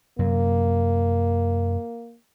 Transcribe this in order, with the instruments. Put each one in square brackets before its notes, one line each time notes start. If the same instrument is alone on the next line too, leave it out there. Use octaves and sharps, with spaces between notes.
[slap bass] F#2 C3 F#3 [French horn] A#3